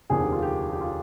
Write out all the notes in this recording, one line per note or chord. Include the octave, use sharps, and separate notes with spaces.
F1 D#2 D3 F3 G#4
G4
F4
G4
G4
F4